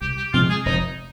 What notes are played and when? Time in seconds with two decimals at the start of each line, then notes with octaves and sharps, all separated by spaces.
0.01 C2 G4
0.17 G4
0.33 C3 F3 G#3 F4
0.49 G#4
0.65 F1 D#4